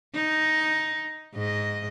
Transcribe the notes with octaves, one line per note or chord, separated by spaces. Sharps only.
D#4
G#2 D#5